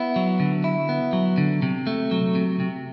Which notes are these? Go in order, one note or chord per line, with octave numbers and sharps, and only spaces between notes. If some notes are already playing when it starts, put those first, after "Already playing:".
Already playing: B3 E4
F#3
D3
E4
B3
F#3
D3
C3
A3
F#3
C3
C3